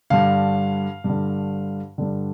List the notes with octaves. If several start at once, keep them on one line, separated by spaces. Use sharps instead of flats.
G2 D3 F5
G2 D3
G2 D3